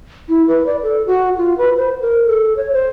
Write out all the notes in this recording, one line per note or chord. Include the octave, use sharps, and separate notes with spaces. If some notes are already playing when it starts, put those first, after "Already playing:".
E4
B4
D5
A4
F#4
F4
B4
C5
A#4
A4
C#5
C5